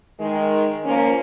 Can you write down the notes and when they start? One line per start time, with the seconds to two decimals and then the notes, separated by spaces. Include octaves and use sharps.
0.20 D#3 G#3
0.85 F3 A#3 C#4